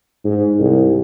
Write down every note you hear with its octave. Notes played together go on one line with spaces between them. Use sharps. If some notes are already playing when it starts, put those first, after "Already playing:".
G#2
C2